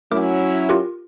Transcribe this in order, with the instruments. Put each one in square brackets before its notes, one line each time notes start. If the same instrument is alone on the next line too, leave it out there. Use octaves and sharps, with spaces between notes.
[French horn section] F#3 C#4 E4 [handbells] A3 A#4 D6
[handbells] F4 G4 A#4